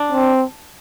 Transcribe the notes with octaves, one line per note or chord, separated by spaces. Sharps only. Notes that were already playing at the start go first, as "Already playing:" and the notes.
Already playing: D4
C4